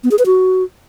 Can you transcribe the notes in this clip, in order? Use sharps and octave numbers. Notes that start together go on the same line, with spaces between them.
B3
G#4
B4
F#4